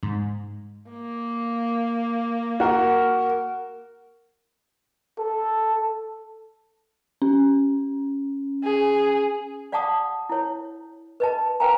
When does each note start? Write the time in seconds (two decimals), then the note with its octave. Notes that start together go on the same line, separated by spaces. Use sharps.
0.03 G#2
0.90 A#3
2.60 F#4 A#4
5.19 A4
7.22 C#4
8.63 G#4
9.72 D5 F5 F#5 A5 D6 D#6
10.29 E4 C#5
11.20 B4 D#5 A5
11.60 B4 C5 F5 G5 G#5 A#5